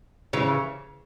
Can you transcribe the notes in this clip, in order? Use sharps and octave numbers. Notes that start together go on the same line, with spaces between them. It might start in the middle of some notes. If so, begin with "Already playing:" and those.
C#3 E3